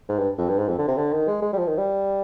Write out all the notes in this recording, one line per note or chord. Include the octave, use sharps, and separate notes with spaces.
G#2
G2
F2
G2
G#2
F2
D3
C3
D3
D#3
G#3
G#3
G3
F3
D#3
G3